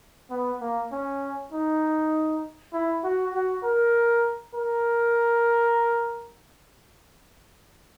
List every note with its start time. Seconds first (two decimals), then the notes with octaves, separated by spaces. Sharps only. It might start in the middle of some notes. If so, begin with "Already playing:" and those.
0.31 B3
0.61 A#3
0.92 C#4
1.52 D#4
2.73 E4
3.04 F#4
3.34 F#4
3.64 A#4
4.54 A#4